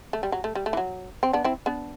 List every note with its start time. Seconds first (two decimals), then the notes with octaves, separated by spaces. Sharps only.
0.13 A3
0.23 G3
0.32 F#3
0.44 A3
0.55 G3
0.66 A3
0.73 E3
0.77 F#3
1.23 C4
1.33 B3 D4
1.44 C4 E4
1.66 B3 D4